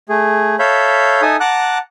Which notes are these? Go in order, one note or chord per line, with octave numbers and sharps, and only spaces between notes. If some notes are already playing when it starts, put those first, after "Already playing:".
A3 G#4
A4 C#5 E5 F5 B5 G6
D#4 A4 E5 G#5 D#6
F#5 A5 A#5 D6 F#6